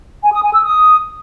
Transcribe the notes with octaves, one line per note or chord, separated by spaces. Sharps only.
G#5
D#6
G#5
E6
D#6